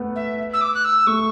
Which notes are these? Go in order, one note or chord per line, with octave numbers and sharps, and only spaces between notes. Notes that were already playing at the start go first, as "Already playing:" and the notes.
Already playing: A3 B3
E5
E6
D6
F#6
E6
A3 C#6